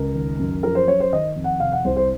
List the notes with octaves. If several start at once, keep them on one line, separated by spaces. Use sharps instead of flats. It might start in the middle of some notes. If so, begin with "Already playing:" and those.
Already playing: C#2 A#4
D#3
F#2
F3 A#4
C5
F#2 C#5
C5
D#3 D#5
F2
F#5
C3 F5
F#5
C2 C5
C5